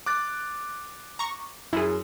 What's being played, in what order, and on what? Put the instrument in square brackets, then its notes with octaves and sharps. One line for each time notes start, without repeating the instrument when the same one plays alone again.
[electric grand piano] D6 F#6 A6
[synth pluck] A#5 C#6
[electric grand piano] F#2 [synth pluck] E4 G#4